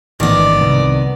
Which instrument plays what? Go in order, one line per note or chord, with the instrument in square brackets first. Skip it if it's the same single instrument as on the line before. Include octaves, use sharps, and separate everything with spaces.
[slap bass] A1 G#2 [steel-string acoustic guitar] D#3 B3 [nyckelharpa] D5
[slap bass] C2